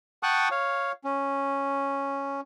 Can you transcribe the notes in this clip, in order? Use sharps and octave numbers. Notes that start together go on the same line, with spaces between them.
F#5 G5 A5 C#6 D#6 F#6
C#5 F5
C#4